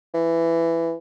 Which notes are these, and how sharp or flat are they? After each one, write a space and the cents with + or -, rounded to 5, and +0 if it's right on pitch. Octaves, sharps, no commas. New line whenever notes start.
E3 +10